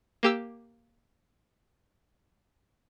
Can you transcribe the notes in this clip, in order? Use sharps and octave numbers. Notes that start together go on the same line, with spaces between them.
A#3 G4 E6